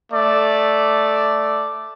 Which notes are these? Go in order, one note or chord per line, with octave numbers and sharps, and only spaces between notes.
A3 D5